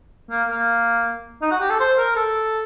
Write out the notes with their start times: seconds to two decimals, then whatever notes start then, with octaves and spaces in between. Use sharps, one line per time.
0.31 A#3
0.49 A#3
1.42 D#4
1.51 F#4
1.61 G4
1.70 A4
1.80 C5
1.98 A#4
2.16 A4